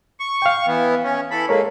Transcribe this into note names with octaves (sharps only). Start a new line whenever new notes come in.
C#6
F5 G5
E3 B3
C#4
E3 A4 B5
G#3 A#3 A4 A#4 C#5